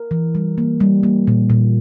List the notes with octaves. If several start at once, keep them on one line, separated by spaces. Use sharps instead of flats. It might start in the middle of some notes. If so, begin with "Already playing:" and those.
Already playing: A#4
E3
G3
A#3
G3
A#3
A#2
A#2